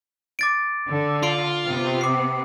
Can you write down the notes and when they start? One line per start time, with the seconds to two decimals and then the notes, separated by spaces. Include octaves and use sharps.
0.39 D6 A6 D7
0.88 D3
1.23 F4 C6 C7 D7
1.67 C3 B3 C4
2.01 D6 C7